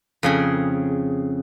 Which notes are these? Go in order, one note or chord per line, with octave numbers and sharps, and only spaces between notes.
F2 C#3 G#4